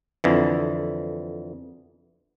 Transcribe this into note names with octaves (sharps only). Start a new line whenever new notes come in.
F2 D3 E3